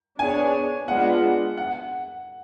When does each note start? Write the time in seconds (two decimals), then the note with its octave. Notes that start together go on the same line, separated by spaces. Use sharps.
0.19 B3 D4 G#4 C#5 G#5
0.88 G#3 B3 D4 F4 F#5
1.57 F#5